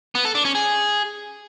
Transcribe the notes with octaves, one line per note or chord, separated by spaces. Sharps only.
B3
A4
D4
C#4
G#4